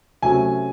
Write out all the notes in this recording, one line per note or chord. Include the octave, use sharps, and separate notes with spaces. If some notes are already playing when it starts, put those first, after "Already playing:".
C3 F#3 A3 C#4 G#5